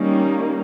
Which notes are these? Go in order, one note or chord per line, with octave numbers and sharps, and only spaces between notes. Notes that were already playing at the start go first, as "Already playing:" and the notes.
Already playing: D#3 G3 A#3 C#4